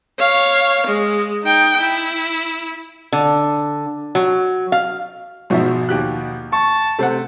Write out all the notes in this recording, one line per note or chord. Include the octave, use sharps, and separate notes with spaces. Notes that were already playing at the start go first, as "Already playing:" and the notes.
C#5 F5
G#3
D#4 G5
E4
D3
F#3
F5
G#1 B2 F3 D#4 E5
D#2 G4 F#6
A5 C#6
C3 A3 C5 F#5